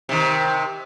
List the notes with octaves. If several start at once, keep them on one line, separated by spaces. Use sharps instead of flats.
C3 D#3